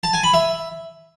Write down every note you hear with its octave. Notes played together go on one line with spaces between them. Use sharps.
A5
G#5
B5
E5